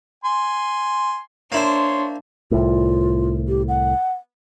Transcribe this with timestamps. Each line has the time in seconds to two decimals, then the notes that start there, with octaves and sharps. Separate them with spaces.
0.24 G#5 C6
1.52 A#3 D4 E4 C5 C#5 C6
2.51 C2 A2 F4
3.48 G4
3.68 F#5